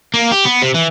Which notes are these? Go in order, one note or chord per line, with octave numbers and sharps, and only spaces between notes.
A#3
G4
B3
C3
E3